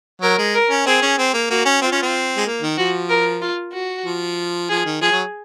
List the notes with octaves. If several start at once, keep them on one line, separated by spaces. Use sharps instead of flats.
F#3 A#4
G#3
A#4
C#4
C4 G#4
C#4
C4
A#3
A#3 F#4
C#4
C4 F4
C#4
C4
G#3
A#3
D#3
F3 F#4
A#4
F4
F#4
F3
F3 G#4
D#3
F3 G#4
F#3